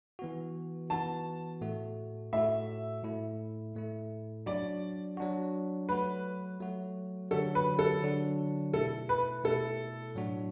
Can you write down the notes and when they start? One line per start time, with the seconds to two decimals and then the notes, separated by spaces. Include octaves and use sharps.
0.19 E3 B3 F#4
0.90 E3 B3 F#4 A5
1.61 A2 A3 F#4
2.33 A2 A3 F#4 E5
3.04 A2 A3 E4
3.75 A2 A3 E4
4.46 F#3 D4 F#4 D5
5.17 F#3 D4 F#4
5.89 F#3 A3 F#4 B4
6.61 F#3 A3 F#4
7.31 D3 F#3 D4 F#4 A4
7.55 B4
7.79 A4
8.02 D3 F#3 D4 F#4
8.73 B2 A3 E4 A4
9.09 B4
9.44 B2 A3 E4 A4
10.15 A2 F#3 D4 F#4